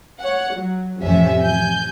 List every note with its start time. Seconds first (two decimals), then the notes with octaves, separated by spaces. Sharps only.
0.20 C#5 F#5
0.54 F#3
1.02 A1 F2 C3 C#4 E5
1.42 G#5 G6